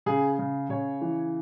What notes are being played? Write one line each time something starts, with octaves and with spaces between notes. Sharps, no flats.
C#3 G#4
C#3
C#3 C#5
E3